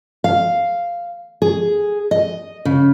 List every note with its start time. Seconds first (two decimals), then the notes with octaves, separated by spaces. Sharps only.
0.24 F5
1.42 G#4
2.11 D#5
2.65 C#3